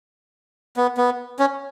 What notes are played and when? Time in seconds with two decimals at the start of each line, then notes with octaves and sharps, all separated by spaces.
0.77 B3
0.97 B3
1.39 C#4